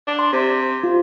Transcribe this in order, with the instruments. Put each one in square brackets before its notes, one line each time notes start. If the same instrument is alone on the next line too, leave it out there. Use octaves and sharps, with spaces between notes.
[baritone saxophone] D4
[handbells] C6
[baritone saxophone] C3
[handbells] F4